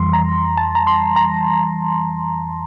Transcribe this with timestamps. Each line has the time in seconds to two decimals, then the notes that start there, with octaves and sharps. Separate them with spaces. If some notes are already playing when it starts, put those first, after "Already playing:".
Already playing: F2 E3 G3 C6
0.13 A#5
0.57 A5
0.75 A#5
0.87 C6
1.16 A#5